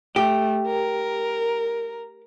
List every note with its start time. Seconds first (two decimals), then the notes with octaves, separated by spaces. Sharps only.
0.16 A3 G4
0.67 A#4